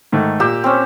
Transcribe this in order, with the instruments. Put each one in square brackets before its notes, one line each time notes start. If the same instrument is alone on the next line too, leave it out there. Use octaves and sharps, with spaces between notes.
[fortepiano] G#2 D#3 A3
[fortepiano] A#2 [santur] G4 E6
[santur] C4 C#4